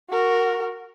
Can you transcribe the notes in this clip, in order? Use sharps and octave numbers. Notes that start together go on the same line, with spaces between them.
F#4 A#4